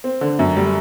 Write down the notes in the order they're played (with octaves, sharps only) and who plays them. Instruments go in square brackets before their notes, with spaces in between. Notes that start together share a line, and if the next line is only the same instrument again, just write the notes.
[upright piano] C4
D3
F#2
G3